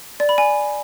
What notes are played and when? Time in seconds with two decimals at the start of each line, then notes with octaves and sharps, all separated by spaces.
0.20 D5
0.29 B5
0.38 G#5